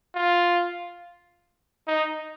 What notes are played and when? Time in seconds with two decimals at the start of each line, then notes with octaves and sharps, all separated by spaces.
0.15 F4
1.88 D#4